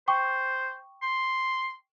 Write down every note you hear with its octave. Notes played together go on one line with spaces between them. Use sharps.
C5 G5 C#6 D6
C6